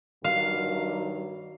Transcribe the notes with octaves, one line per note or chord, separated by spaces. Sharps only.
G2 D#3 F#3 F5